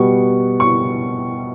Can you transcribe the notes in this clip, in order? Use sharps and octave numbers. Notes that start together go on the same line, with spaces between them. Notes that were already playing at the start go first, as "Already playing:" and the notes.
Already playing: B2 G3 B3 C#6
C#6